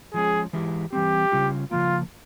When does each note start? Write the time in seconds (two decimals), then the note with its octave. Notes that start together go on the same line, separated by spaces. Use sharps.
0.14 F3 G#3 C#4 G#4
0.53 E3 G#3 E4 G4
0.93 E3 G3 C4 G4
1.32 C#3 G3 C#4 F4
1.71 C#3 F3 A#3 F4